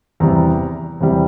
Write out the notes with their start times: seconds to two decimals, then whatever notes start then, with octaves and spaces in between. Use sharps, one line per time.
0.20 E2 C3 G3 A#5
1.01 E2 C3 G3